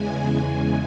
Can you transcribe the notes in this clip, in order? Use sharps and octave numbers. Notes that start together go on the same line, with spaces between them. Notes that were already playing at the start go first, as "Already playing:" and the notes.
Already playing: E2 C#3 E3 G#3 G#5